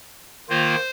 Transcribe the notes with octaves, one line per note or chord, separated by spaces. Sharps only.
D#3 A#3 F4 C5